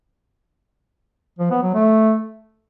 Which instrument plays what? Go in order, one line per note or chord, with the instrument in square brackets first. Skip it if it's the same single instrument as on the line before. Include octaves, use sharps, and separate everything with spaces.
[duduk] F3
B3
F#3
A3